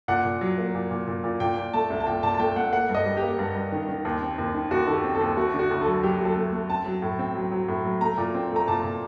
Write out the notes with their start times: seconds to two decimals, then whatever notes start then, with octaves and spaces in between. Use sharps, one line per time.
0.08 A#2 F#5
0.25 A#2
0.41 F#3
0.58 A#3
0.75 A#2
0.91 A#2
1.07 A#2
1.24 A#2
1.40 A#2 G5
1.57 A#2
1.73 A3 A5
1.90 C2
2.00 A5
2.07 A#2 G5
2.23 A#2 A5
2.34 A5
2.39 A3 G5
2.56 A3 F#5
2.72 A#3 F#5
2.89 G2
2.95 D#5
3.06 G3
3.17 G4
3.22 A#3
3.39 G2
3.55 G2
3.72 D#3
3.89 D#3
4.05 D#2
4.22 C4
4.38 D#2
4.54 D#3
4.71 D#2 F#4
4.87 D#3 A4
4.93 G4
5.04 C4
5.15 A4
5.21 D#2
5.37 A3 F#4
5.54 D3
5.59 F#4
5.71 D2
5.81 A4
5.87 F#3
6.03 F#3 G4
6.20 F#3
6.25 A4
6.36 A3
6.52 A3
6.70 C4 A5
6.86 F#3
7.02 A2
7.19 C4
7.35 F#3
7.52 F#3
7.68 A2
7.85 F#3
8.01 A3 A#5
8.18 A#2
8.34 C4
8.51 A3 A#5
8.68 A#2 A5
8.84 A#2